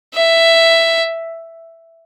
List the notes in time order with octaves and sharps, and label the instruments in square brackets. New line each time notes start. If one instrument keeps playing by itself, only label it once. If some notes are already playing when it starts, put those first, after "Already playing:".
[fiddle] E5